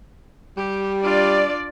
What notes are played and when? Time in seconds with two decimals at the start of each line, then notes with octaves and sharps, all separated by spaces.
0.57 G3 G4
1.03 D4 F4 D5